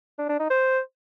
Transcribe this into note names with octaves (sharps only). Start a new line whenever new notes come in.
D4
D4
D#4
C5